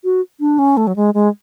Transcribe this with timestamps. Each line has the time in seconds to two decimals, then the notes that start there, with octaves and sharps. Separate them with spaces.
0.04 F#4
0.40 D4
0.59 C#4
0.77 A3
0.87 F#3
0.96 G#3
1.14 G#3